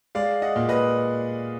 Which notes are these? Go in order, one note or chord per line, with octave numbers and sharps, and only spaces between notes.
G#3 D5 F5
D#5 F#5
A#2
B4 D#5